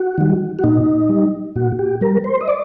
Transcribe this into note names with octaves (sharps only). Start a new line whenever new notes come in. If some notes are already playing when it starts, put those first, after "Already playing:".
Already playing: F#4
D#3 G3
F#4
A#2 D#4
G3
A#2 F#4
G4
G3 A#4
C5
D#5
D5